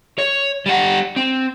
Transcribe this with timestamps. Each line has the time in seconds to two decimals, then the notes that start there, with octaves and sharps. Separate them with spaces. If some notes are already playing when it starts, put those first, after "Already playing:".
0.18 C#5
0.66 G3 F#5
1.16 C4